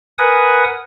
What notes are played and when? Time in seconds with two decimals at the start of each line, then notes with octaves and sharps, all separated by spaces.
0.18 A#4 B4 F#5 G#5 D#6